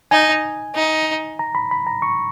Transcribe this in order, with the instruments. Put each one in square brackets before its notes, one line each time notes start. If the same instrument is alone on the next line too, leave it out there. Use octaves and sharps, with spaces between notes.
[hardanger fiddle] D#4 [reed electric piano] G#5
[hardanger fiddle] D#4
[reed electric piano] A#5
B5
B5
A#5
C#6